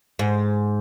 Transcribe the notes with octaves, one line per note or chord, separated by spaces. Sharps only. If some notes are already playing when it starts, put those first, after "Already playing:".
G#2